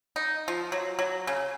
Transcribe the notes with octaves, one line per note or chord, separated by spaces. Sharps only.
D#4
F3
F#3
F#3
C#3